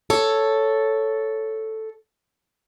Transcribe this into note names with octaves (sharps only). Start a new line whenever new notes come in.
A4 C#5